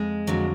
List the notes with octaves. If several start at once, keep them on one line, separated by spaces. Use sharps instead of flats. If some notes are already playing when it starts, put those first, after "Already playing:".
Already playing: F2 G#3
F2 D3 F#3